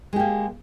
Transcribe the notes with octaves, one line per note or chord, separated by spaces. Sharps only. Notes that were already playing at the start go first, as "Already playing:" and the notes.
G#3 A#3 G4